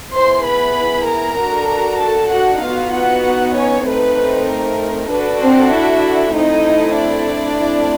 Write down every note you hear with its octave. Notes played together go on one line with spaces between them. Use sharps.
B3 E4 G#4 C5 C6
B4 B5
A#4 A#5
D4 F#4 A4
A4 A5
F#4 F#5
B3 D#4 F4 F#4 F5
F#4 F#5
C#4 C#5
A3 C4 D#4 B4
A#4
D4 F#4 A4 B4
C4 C5
E4 E5
A3 C4 D#4 E4 A4 D#5
D4 D5
A3 C4 E4